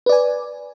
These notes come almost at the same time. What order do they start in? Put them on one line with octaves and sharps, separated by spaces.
B4 D5 G#5